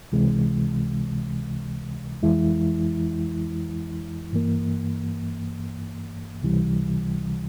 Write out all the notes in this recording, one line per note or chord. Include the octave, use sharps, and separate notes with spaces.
C#2 C3 E3 G#3
F2 E3 G#3 E4
G2 E3 A#3
C#2 C3 E3 G3